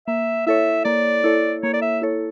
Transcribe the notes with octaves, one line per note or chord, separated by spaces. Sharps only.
A#3 E5
E4 A4 C#5 E5
A#3 D5
E4 A4 C#5
A#3 C#5
D5
E5
E4 A4 C#5